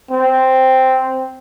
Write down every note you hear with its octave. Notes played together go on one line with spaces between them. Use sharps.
C4